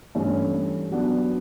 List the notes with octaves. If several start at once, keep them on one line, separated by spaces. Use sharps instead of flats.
G2 E3 A3 C#4
F#3 B3 D4